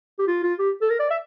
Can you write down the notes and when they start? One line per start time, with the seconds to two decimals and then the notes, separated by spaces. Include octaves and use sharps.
0.19 G4
0.27 F4
0.43 F4
0.59 G4
0.81 A4
0.90 A#4
0.99 D5
1.10 E5